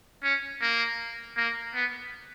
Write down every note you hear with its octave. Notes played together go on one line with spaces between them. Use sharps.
C#4
A#3
A#3
B3